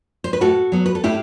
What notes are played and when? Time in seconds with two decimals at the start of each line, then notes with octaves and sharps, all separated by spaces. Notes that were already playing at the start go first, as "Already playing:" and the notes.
0.24 C5
0.33 B4
0.41 A2 F#4 A4
0.72 F#3 B3
0.86 B4
0.95 A4
1.04 A2 E4 G4